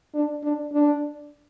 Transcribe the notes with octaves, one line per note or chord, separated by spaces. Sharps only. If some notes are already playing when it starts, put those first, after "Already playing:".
D4
D4
D4